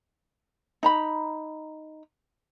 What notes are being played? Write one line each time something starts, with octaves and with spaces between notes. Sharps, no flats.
D#4 A#5 B5